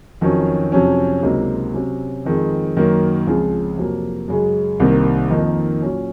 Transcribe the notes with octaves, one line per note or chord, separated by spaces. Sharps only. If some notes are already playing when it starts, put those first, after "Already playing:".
F2 D#3 F#3 C#4
F2 C3 F#3 C#4
C#2 C3 F#3 A#3 D#4
C3 F#3 C#4
F2 D#3 G#3 C4
F#2 D#3 F#3 A#3
C#2 C#3 F3 C4
F2 C3 F#3 A#3
F#2 C#3 G#3
C2 C3 D#3 A#3
F2 D#3 A#3 D#4
A#2 F#3 C#4